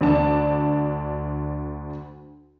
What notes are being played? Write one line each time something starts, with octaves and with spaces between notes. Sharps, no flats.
D2 D4 A5